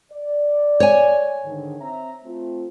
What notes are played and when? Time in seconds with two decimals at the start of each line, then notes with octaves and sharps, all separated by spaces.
0.12 D5
0.80 C#5 G#5
1.45 G#2 D3 D#3
1.80 C4 E5 A#5
2.25 A3 C4 F4